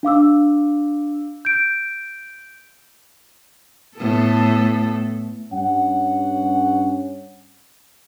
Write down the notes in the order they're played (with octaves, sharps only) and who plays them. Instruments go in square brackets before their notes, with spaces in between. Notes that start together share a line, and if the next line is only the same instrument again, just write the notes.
[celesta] D4 F5 D6 E6
G6 D7
[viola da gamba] A2 B3 A4
[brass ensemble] G2 C#4 F#5